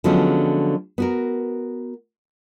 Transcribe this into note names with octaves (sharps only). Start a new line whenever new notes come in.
D3 F3 F#3 G#3 B3 C#4
B3 F#4 A#4